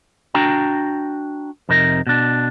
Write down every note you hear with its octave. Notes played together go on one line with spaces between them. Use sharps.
D4 F#4 G5 A#5
F2 C3 D#4 A#4
B2 D4